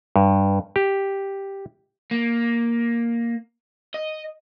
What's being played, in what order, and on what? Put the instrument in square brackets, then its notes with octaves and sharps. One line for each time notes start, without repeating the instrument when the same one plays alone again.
[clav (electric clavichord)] G2
G4
[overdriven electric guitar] A#3
D#5